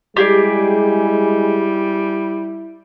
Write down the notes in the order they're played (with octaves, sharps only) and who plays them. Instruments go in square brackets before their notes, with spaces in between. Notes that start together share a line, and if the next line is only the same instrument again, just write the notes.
[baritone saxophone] G3 [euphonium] G#3 [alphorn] E4 [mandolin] G4 G#4 D5